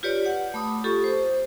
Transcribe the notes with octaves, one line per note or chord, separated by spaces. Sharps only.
F4 G4 B4 C#5 D5
F#5
A3 B5 D6 D#6
F4 G4 A4 C#6
C5